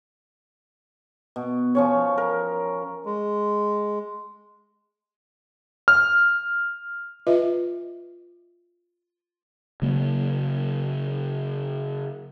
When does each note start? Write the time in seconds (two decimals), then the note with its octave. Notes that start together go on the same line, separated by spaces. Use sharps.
1.36 B2
1.75 F3 C#4 C#5
2.18 A#4
3.05 G#3
5.88 F6
7.27 F4 B4 D#5 E5
9.82 C#3 F#3 A#3